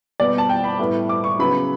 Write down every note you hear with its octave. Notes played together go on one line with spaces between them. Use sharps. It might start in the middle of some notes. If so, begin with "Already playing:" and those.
B2 G3 B3 D5
A5
G5
B5
A2 G3 B3
D6
C#6
C#3 F#3 B3 B5